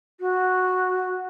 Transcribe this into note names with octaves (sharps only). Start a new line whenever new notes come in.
F#4